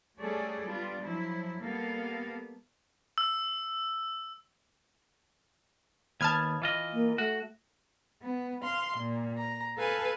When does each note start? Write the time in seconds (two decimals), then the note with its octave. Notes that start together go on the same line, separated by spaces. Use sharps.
0.20 G3 A3 C#4 G#4 A4 D5
0.66 G3 B3 D4 F4
1.01 F3 F#3 E4
1.62 G3 A#3 B3 A4 F5
3.18 E6
6.21 D#2 B3 A5 F6 G#6
6.62 E3 F4 D#5
6.93 A#3
7.18 A3 F#4
8.22 B3
8.63 F5 C6
8.97 A#2
9.38 A#5
9.78 A4 B4 F5 G#5